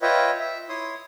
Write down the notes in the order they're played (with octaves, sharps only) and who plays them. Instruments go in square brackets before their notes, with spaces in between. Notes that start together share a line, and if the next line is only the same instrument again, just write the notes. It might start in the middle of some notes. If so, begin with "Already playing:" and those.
[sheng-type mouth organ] F4 B4 C#5 D#5 E5 G5
E5
E4 C#5 C6 D#6